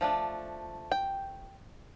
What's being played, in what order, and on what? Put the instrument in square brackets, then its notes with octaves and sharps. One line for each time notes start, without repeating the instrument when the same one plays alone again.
[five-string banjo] F3 A3 D4
G5